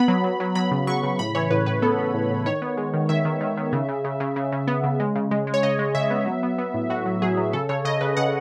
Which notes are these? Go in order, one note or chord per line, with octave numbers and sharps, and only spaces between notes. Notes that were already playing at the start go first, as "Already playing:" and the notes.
Already playing: B3 B5
F#3
F#3
F#3
F#3 B5
C#3
F#3 C#6
C#3
A2 B5
E3 C#5
A2 B4
A2 B4
B3 A4
B3
A2
A2
D#3 C#5
B3
G#3
D#3
D#3 E5
D#3
D#3
D#3
C#3
C#3
C#3
C#3
C#3
C#3
B3
C#3
G#3
C#3
G#3
G#3
C#5
C#3 D#5
G#3
C#3 E5
B3
F#3
B3
B3
A2
A2 F#4
F#3
F#3 G#4
F#3
C#3 A4
C#3 C#5
C#3 D#5
C#3 B4
C#3 F#5